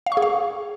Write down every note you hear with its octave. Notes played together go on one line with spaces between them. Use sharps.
F5
C#6
G#4
F5